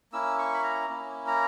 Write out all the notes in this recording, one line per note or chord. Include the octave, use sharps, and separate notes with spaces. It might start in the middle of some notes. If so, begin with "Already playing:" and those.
A#3 C#4 E4 E6
C#6
B5
A#5
A#3 C#4 E4
A#5